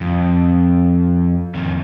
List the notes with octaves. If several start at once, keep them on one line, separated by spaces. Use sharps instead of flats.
F2
F2 D#3